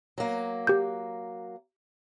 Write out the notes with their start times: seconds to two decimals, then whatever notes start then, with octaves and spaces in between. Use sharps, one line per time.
0.18 F#3 A#3
0.67 G4 G6